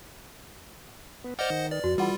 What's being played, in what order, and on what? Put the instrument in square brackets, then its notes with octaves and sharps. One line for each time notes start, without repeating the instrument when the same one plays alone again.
[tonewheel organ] B3
[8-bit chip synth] C5 D#5 F#5 [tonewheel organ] D5 F6 G6
[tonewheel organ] D#3
[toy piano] B4 [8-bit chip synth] D5
[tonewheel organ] F2 [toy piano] F#4
[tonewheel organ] E3 [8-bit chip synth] G3 F4 [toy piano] G#4 F#5 B5